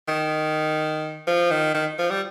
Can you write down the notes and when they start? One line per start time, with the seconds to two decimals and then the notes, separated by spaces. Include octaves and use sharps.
0.08 D#3
1.27 F3
1.51 D#3
1.75 D#3
1.99 F3
2.10 G3